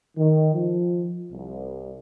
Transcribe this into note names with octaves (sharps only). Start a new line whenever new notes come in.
D#3
F3
C2